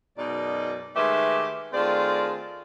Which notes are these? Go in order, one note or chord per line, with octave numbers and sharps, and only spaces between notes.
F#2 B2 G#3 D#4 D5
D#3 G#3 A3 G4 B4 E5
D#3 A3 C4 F4 G#4 D5